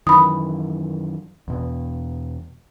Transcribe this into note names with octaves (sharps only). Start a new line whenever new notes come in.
F#2 D#3 E3 B5 D#6
E2 B2 B3